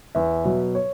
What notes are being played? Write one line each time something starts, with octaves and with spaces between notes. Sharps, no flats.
E2 E5
B2 F#3
C#5